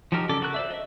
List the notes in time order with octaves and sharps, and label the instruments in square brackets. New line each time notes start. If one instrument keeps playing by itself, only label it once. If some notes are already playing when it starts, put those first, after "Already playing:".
[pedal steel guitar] F3 F#3 D#4 G4 A#4
C#3 A4 D5 D6
F#4 A4 A#4 F#6
C5 D5 E5
D#5 E5